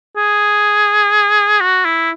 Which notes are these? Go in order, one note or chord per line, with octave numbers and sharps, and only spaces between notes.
G#4
F#4
E4